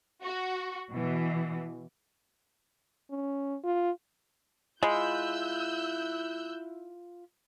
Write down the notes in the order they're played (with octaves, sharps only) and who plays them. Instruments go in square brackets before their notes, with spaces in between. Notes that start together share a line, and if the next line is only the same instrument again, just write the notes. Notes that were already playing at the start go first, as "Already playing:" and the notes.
[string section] F#4
B2 E3
[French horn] C#4
F4
[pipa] G#3 [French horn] E4 [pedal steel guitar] F4 B5 [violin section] E6 F#6 G6